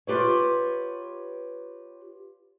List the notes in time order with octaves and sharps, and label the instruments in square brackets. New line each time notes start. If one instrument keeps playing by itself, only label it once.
[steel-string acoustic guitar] F4 G4 B4 C#5